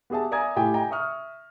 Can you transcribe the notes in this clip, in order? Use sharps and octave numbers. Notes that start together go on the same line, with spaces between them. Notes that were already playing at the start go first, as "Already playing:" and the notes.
B3 G4 G#4 E5 A5
D5 E5 G#5 A#5 D#6 G#6
A2 G4 G5 G#5
D#5 G5 G#5 A#5
E5 C#6 D#6 F6